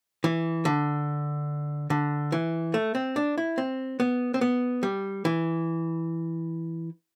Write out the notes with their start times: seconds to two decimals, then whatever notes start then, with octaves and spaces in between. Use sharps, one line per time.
0.24 E3
0.65 D3
1.90 D3
2.32 E3
2.74 A3
2.95 C4
3.16 D4
3.38 E4
3.58 C4
4.00 B3
4.34 C4
4.41 B3
4.83 G3
5.25 E3